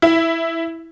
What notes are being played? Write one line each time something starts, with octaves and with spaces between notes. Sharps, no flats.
E4